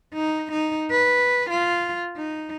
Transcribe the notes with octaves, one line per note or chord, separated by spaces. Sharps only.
D#4
D#4
B4
F4
D#4